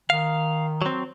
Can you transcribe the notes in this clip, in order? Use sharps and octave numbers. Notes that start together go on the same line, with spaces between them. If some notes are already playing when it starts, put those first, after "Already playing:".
D#3 F5
F#3 C4